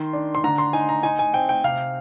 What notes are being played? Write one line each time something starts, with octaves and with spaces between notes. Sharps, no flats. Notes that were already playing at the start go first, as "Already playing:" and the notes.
Already playing: D#3 C6
D4
C6
D3 A#5
C6
D#4 G#5
A#5
D#4 G#5
G#5
C4 G5
G5
C3 F5